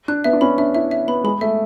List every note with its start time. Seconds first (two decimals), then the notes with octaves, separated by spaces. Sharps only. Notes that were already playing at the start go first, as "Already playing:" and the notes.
0.08 D4 F#6
0.24 B3 E5
0.33 D4
0.41 C#4 B5
0.58 D4 E5
0.75 E4 E5
0.91 E5
1.08 B3 B5
1.24 G#3 B5
1.41 A3 E5